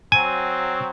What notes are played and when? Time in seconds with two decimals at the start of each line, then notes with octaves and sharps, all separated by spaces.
0.12 F#3 C4 G#5